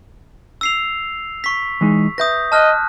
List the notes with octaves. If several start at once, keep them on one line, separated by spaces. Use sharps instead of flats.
E6 C7 F7
C#6 B6
E3 G#3 D#4
B4 E5 D#6 G6 A#6
D#5 A5 F6 F#6